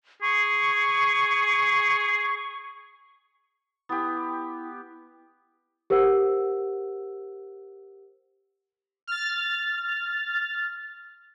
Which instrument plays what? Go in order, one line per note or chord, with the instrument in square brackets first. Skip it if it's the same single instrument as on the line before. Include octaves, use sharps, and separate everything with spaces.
[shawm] G#4 [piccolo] C#6
[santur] B3 G4 [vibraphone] E4
[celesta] G4 A#4 C5 F#5 E6
[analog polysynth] F6 A6